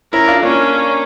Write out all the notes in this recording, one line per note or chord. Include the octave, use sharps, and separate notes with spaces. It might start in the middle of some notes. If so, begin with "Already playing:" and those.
C#4 E4 A#4
D4 F4
A#3 C#4 D4